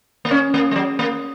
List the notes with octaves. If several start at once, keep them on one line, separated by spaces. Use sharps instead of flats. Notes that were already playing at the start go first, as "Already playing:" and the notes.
A#3
C#4
A#3
G#3
F#3
A#3